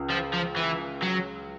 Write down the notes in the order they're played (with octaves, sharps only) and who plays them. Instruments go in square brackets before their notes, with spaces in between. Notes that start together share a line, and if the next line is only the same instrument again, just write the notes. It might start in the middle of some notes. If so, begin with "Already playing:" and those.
Already playing: [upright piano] C#2
[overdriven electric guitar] F3
F3
E3
F#3